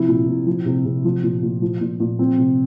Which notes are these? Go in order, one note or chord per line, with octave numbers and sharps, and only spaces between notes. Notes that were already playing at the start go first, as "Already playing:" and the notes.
Already playing: C3 F3 E4
A#2
A#2
F3
C3
C3
F3
A#2
A#2
F3
A#2
A#2
F3 C4
C3